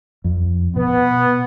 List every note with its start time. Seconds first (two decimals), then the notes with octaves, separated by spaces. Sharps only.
0.24 F2
0.76 B2 B3